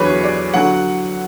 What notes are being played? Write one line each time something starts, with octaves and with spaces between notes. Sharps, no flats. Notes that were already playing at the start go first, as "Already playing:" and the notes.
Already playing: E2 D3 F#3 G#4 B4 C#5
D5
D3 F#3 F#5